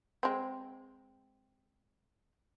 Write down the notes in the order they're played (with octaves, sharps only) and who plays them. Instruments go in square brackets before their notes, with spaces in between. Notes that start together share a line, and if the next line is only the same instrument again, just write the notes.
[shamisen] G#3 C4